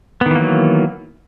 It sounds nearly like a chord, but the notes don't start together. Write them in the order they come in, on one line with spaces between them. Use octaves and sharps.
B3 D#3 E3 A#3 F#3